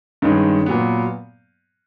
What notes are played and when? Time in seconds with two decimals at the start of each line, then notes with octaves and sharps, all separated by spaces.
0.22 G2 D#3 G#3 C#4
0.66 A#2 F#3 B3